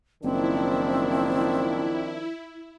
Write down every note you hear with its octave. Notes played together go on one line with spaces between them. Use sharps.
F#1 D#3 F3 C4 D4 E4